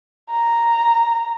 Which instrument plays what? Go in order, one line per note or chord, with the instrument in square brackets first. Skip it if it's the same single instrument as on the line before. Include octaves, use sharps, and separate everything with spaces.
[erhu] A#5